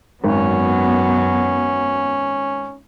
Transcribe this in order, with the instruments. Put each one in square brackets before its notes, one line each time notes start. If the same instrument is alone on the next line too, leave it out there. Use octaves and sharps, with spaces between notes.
[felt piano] G#1 [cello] F#2 F#3 [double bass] B3 [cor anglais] C#4